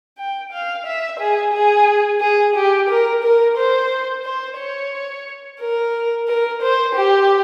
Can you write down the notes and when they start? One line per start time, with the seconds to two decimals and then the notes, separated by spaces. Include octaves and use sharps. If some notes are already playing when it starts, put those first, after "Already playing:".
0.18 G5
0.52 F5
0.86 E5
1.19 G#4
1.53 G#4
2.21 G#4
2.56 G4
2.89 A#4
3.23 A#4
3.57 C5
4.25 C5
4.58 C#5
5.61 A#4
6.28 A#4
6.62 C5
6.96 G4